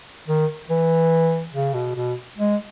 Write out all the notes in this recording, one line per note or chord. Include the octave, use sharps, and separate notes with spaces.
D#3
E3
C#3
B2
B2
G#3